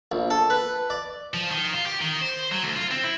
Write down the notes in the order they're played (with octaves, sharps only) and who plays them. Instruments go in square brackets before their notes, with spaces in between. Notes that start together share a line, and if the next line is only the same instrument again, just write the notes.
[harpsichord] A#1
A4
B4
D5
[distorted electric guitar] F3
D#3
F4
G4
D#3
C5
F#3
D2
F4
C4
E4